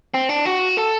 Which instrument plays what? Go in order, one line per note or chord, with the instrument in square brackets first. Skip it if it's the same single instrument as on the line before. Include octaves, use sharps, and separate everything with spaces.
[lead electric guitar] C4
D4
F#4
A4